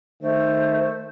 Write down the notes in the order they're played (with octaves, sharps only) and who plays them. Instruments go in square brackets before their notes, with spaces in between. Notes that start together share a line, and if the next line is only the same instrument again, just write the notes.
[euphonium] D#3 [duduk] A3 [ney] C5